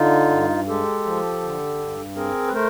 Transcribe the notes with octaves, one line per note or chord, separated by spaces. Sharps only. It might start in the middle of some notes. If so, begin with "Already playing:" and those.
Already playing: D3 D#4 F4
G2
G#3 G4 A4
F3
D3
G2
C4 G#4 A#4
B4
A3 A#4 C5